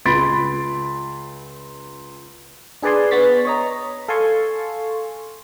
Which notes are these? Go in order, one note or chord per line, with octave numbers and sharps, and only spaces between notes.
C#2 B5 C6 A6 B6 D7
D4 G#4 B4 D5 G#5 C6
B3 C#6 A6 B6
C#5 D#5 A#5
A4 F5 G#5 A5 C6 C#6